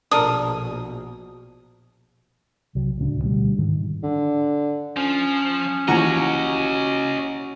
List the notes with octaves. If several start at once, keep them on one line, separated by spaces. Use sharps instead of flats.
A#1 B2 D4 A4 A#4 D#6
C2 F#3
D1 C#2 C4 D4
D2 B2 G3
G#2 D#3
D3
F3 C#4
D#2 E3 F3 F#4 C#5 D#5 A#5